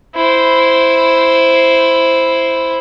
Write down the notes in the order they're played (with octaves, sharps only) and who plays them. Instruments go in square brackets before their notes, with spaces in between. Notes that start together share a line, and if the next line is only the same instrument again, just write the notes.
[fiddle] E4 C5